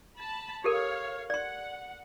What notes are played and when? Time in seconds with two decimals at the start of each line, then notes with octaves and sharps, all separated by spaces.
0.17 A5 B5
0.64 G4 A4 A#4 C#5 F5
1.30 D5 F#5 C6